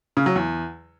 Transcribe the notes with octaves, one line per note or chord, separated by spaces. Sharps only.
C#3
F#3
E2